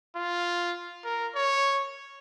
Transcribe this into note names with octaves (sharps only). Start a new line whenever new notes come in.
F4
A#4
C#5